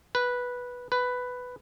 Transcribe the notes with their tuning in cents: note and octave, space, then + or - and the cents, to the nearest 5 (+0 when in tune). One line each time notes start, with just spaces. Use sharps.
B4 -10
B4 +5